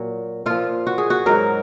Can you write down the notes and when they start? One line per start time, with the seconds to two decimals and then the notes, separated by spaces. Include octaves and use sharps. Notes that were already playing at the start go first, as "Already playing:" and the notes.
Already playing: A#2 F#3
0.46 A#2 F3 F4
0.87 F#4
0.98 G#4
1.10 F#4
1.26 G#2 F#3 A#4